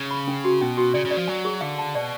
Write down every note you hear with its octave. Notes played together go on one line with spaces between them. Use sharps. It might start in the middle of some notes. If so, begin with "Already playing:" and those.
Already playing: C#3
B5
C#4
F#4
B2 C#4
F#4
C#3 D5
C#3
D5
F3
F#3 G#5
G#4
D3 F5
A5
B2 D5